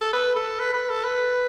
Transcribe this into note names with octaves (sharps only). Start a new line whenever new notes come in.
A4
B4
A4
B4
B4
A4
B4